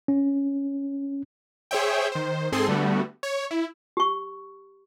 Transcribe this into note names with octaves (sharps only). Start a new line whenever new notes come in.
C#4
G#4 C5 C#5 E5 G5
D#3 C5
G#2 C4 G#4 A4 C6
D3 G3 A3 B3 F#4
C#5
E4
G4 C#6